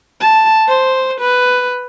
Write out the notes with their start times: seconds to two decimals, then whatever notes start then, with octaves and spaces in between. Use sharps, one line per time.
0.20 A5
0.68 C5
1.21 B4